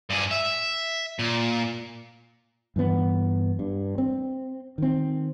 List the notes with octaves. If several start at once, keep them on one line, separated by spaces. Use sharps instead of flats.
G2 G#4
E5
A#2
G2 E3 B3
G2
C4
D#3 C4